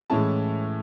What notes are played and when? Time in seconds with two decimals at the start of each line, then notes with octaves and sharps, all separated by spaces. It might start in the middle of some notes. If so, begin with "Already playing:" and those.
0.10 A2 E3 G#3 C#4 E4 A5